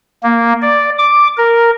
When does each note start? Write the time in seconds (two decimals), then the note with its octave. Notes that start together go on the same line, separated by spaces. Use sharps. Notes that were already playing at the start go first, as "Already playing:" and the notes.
0.23 A#3
0.62 D5
0.98 D6
1.38 A#4